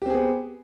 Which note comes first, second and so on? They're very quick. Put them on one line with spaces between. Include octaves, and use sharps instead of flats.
G4 C4 G#4 B3